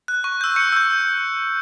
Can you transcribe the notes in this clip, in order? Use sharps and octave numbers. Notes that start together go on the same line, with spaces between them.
F#6
C#6
E6 G6
C#6 C#7
E6 G6